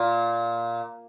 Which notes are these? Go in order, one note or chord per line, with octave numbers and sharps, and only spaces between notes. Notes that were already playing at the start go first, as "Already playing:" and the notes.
Already playing: A#2